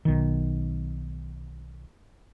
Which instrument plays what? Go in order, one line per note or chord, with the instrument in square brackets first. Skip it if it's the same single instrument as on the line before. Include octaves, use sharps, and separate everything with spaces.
[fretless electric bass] B1 D#3